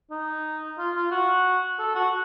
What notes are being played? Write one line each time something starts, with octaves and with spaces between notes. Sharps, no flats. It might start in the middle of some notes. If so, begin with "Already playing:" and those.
D#4
F4
F4
F#4
A4
F#4